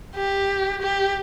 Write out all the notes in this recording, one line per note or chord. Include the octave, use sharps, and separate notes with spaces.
G4
G4